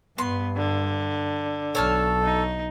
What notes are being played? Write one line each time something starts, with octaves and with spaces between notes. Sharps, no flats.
G2 B3 C6
D3
B1 A4 C#5 A5 F6
D#4